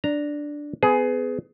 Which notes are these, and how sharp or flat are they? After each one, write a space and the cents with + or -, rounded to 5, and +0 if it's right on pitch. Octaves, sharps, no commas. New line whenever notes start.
D4 +0 A#5 +0
B3 +30 G#4 +15